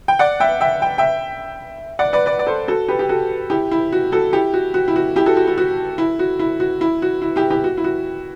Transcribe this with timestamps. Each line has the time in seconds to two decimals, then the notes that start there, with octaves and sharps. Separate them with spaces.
0.08 G5
0.19 D5 F#5
0.40 E5 G5
0.61 E5 G5
0.82 G5
0.98 E5 G5
1.99 D5 F#5
2.13 B4 D5
2.26 B4 D5
2.39 D5
2.47 A4 C5
2.68 F#4 A4
2.88 G4 B4
2.99 G4
3.09 F#4 A4
3.50 E4 G4
3.71 E4
3.92 F#4
4.12 F#4 A4
4.33 E4 G4
4.54 F#4
4.74 F#4
4.88 E4
4.96 F#4
5.16 E4 G4
5.26 F#4 A4
5.37 F#4
5.47 F#4
5.58 F#4
5.98 E4
6.19 F#4
6.39 E4
6.60 F#4
6.81 E4
7.02 F#4
7.22 E4
7.36 E4 G4
7.51 E4 G4
7.64 F#4
7.77 E4
7.84 F#4